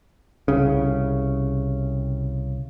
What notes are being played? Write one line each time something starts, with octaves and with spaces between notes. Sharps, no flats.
C2 C#3